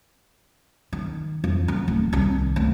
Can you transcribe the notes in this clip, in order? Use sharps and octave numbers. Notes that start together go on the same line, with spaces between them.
D#3
F2
D3
D1
C2 D#3
D2